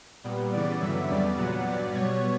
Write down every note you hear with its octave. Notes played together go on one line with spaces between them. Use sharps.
A#2 G3 B3
C#3 E3 B3 D5
G2 D3 F#3 B3 E5
E2 C#3 G3 B3 D5
A#2 F#3 B3 F#5
G2 F#3 B3 D5
B2 G3 B3 C#5